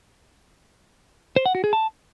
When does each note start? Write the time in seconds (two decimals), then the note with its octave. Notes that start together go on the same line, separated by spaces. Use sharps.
1.36 C5
1.46 F#5
1.55 F#4
1.64 G#4
1.73 A5